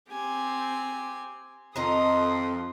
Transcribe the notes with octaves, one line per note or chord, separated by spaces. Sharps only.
C4 G4 G#5
F2 D#3 A4 D#5 A#5 C6 D#6